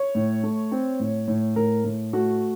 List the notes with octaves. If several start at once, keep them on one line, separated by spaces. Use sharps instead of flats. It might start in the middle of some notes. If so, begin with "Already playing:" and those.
Already playing: C#5
A2
A3
C4
A2
A2
A2 A#4
A2
A3 F#4